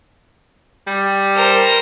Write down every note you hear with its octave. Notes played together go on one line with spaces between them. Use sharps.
G3
A#4 C5